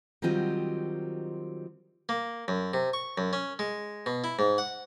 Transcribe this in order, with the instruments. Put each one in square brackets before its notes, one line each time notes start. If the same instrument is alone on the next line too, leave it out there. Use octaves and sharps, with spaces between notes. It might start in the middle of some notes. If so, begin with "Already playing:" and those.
[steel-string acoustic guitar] D#3 F#3 G3 C4 F4 D#5
[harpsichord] A#3
F#2
C3
C#6
F#2
C#4
G#3
B2
E4
G#2
F#5